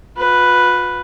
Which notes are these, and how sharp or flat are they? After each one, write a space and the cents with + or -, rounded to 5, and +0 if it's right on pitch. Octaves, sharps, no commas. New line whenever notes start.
F4 +45 B4 +0